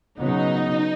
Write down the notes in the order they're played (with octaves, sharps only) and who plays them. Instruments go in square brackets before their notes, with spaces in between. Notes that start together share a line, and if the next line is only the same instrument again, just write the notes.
[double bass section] C#3 F#3 B3 [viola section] D#4